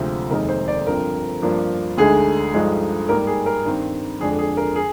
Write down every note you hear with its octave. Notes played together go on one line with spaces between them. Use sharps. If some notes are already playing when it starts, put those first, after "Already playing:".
Already playing: D2 C3 F3 G#3 C4
F1 D#2 D#3 G#3 D#4 A#4
C5
D5
G2 D3 F3 C4 A#4
G2 F3 A#3 D4
D2 D3 G#3 D#4 G#4
G2 D3 F3 G#3 D#4
G#2 G3 A#3 A#4
G#4
A#4
G2 D#3 G3 C4
F2 D3 G#3 D4 G#4
G#4
A#4
G#4